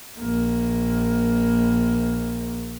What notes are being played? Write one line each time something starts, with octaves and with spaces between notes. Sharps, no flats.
A#1 A#3